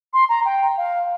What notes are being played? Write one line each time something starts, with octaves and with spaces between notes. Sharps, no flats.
C6
A#5
G5
F5